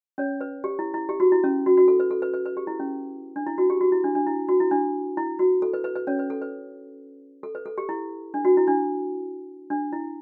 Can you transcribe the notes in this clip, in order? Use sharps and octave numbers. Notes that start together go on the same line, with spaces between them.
C#4 C#5
B4
G4
E4
E4
G4
F#4
E4
C#4
F#4
F#4
A4
B4
A4
B4
B4
B4
G4
E4
C#4
D4
E4
F#4
G4
F#4
E4
D4
D4
E4
F#4
E4
D4
E4
F#4
A4
B4
B4
B4
C#4 C#5
B4
A4
B4
A4
B4
A4
G4
E4
D4
F#4
E4
D4
D4
E4